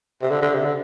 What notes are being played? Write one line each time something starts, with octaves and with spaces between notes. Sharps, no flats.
C3
D3
D3
C3
D3